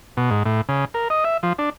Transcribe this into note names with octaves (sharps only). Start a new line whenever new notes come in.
B2
G#2
A2
C#3
A#4
D#5
E5
F3
D4